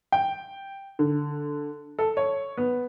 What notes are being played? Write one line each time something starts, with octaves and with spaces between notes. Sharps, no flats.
G5
D3
A4
C#5
B3